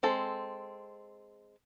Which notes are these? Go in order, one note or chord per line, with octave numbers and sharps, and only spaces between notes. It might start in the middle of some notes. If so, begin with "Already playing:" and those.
G#3 C4 A4